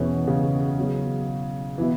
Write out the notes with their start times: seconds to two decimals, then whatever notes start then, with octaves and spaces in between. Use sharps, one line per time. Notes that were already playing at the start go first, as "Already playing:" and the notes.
Already playing: E2 B2 E3 C#4
0.28 C#3
0.78 B2 F#3 E4 G#4 C#5
1.78 B2 E3 B3 E4